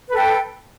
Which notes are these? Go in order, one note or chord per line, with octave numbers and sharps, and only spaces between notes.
A4 B4 G5